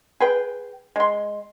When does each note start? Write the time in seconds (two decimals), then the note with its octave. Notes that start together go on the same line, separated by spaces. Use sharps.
0.20 G#4 B4 G5
0.96 G#3 C6